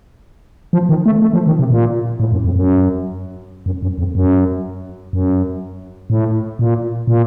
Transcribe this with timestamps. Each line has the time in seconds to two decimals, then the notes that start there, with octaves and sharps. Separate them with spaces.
0.73 F3
0.89 D#3
1.06 A3
1.22 A3
1.33 F3
1.47 D#3
1.59 C3
1.70 A#2
2.20 A2
2.32 F#2
2.45 F2
2.56 F#2
3.66 F#2
3.82 F#2
3.99 F2
4.15 F#2
5.13 F#2
6.10 A2
6.59 A#2
7.08 A#2